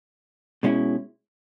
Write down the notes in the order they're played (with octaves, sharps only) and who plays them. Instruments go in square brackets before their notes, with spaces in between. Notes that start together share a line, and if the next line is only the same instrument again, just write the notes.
[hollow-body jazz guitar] B2 G#3 C#4 E4